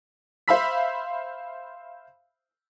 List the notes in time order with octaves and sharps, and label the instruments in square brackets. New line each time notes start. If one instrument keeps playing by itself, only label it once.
[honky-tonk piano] C5 E5 F5 B5 E6 B6